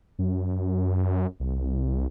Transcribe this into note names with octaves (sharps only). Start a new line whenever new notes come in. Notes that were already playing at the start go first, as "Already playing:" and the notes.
F#2
C2